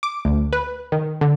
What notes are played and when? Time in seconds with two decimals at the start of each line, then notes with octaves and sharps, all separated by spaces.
0.03 D6
0.25 D2
0.53 B4
0.92 D#3
1.21 D3